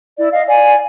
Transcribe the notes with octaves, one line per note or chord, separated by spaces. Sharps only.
E4 D5
D#5 F5
D5 F5 G#5